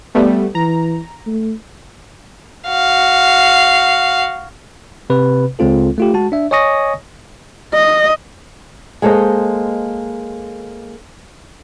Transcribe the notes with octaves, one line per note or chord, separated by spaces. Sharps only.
G3 A3 B3
E3 A#5
A3
F#4 F5
C3 B4
C#2 G#3 C4 F4 A4
A3 F4 G4
G#3 F#4 A5
D4 E5
C#5 D#5 G#5 C#6 D#6 A#6
D#5
G#3 A#3 A4 C5 D#5